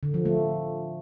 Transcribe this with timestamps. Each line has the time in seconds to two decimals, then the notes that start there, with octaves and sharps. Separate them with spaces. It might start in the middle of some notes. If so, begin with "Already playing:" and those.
0.03 D3
0.14 F3
0.25 A3